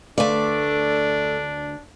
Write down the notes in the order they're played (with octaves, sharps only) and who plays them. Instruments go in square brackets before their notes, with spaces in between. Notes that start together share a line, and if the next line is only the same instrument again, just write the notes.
[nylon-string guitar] D2 B4 F5 [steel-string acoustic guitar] A3 D5 [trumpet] D4 [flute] A4